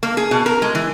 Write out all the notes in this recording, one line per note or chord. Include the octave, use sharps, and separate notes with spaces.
A#3
G#4
B2
A#4
G#3
E3